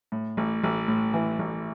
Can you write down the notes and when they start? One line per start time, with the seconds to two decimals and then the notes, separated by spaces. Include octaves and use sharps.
0.12 A2
0.37 A1
0.63 A1
0.88 A2
1.14 E3
1.39 A1